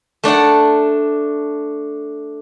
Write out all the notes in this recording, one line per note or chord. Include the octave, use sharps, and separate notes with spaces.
A3 D4 D5 F#5